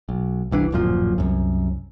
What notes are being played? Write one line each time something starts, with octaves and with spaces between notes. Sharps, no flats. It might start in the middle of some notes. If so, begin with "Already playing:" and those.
B1
F#1 C2 E3 D4
D1 F#2 A#2 F3
C2 F#2